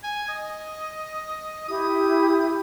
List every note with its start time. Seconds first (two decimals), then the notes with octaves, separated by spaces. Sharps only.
0.04 G#5
0.28 D#5
1.68 E4 G4 D#6